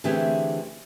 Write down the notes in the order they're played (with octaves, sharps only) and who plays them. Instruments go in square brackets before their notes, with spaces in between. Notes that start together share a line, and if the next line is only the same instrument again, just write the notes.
[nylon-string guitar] D3 E3 A3 C4 G4 G#4